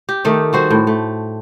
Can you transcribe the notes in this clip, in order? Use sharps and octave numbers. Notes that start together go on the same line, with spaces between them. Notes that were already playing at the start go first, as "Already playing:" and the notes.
G4
D#3 A3 D5
G3 F#4 C5
A2
A3